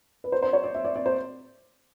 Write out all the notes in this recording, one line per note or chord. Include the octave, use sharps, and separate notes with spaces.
B4
C5
C5
C#5
D5
E5
D5
D5
C5